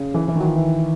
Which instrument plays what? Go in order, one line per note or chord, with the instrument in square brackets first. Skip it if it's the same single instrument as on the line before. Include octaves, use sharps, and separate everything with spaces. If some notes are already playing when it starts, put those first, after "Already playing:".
Already playing: [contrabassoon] C#3
[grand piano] E3
E3
[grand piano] D#3 [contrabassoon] F#3
[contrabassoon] F3
E3